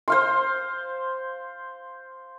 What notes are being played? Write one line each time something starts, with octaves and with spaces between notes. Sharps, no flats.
C5 F5 C6